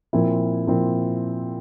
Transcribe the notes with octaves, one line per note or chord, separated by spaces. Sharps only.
A#2 F3 C4 E4
A#2 F3 C4 E4